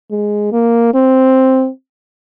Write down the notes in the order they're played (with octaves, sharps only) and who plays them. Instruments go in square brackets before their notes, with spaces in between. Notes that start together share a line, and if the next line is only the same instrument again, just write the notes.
[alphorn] G#3
A#3
C4